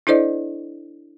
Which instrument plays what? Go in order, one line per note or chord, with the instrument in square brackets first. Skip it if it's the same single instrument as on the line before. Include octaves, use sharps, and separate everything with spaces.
[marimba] D4 E4 A4 C5 D5 D#5